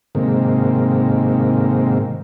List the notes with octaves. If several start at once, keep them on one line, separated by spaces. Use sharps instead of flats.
G#2 C3 D#3 A#3